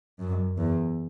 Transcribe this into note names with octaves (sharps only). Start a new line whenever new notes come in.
F#2
E2